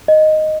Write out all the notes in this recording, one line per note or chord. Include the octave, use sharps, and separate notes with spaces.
D#5